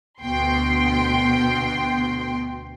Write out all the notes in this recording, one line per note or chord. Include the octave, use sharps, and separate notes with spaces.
D2 B2 G5 C6